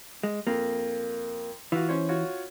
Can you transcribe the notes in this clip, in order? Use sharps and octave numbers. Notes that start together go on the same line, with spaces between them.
G#3
F2 A#3
E3 F4 F#4
C#4 C5 C#5
F4 F#4 C#5